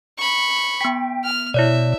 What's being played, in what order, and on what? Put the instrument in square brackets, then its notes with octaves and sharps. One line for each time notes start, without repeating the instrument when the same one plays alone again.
[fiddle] B5 C#6
[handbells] B3 B6 [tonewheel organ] G5
[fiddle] F6
[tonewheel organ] B2 [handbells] E4 C#5 D5 [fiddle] E5